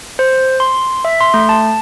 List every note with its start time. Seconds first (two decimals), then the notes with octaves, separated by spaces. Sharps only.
0.19 C5
0.60 C6
1.05 E5
1.21 C6
1.34 A3
1.49 A5